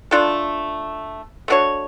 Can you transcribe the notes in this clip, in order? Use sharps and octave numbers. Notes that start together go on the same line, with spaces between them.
A3 D4 F4 A4
A3 D4 F#4 C#5